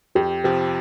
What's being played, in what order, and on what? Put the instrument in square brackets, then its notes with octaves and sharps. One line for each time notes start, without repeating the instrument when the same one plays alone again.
[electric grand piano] F2 [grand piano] G4
[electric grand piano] C3 F3 [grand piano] G4